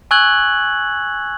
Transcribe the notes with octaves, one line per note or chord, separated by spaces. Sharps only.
G#5 C#6 E6 F#6 G#6 F#7